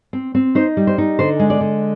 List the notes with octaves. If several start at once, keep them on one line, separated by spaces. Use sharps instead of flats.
C4
C4
D#4 C5
G3
C5
D#4
D3 C5
G#3
D5
D3